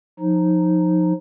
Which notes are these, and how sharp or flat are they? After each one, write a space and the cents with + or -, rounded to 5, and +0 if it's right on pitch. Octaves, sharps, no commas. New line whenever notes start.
F3 +20 D#4 +0